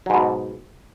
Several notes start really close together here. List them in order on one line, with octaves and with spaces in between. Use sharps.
F#3 G#2 B2